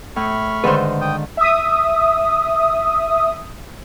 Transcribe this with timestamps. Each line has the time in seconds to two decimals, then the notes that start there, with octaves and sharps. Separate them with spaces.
0.16 A2 B5 C#6 F6
0.64 G#2 D3 D#3 B4 C5
1.01 G5 D#6
1.37 E5 D#6